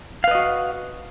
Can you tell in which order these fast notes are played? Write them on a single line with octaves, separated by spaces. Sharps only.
F5 B4 D#5 F#4